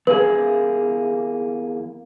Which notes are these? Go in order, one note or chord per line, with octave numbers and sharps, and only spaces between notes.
E2 A#3 G#4 B4